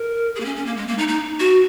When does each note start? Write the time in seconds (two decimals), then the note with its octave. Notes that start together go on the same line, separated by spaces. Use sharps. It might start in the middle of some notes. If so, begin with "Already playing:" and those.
Already playing: A#4
0.35 G#4
0.40 A#3
0.45 C#4
0.56 C#4
0.66 A#3
0.77 G#3
0.88 A#3
0.98 D#4
1.08 D#4
1.40 F#4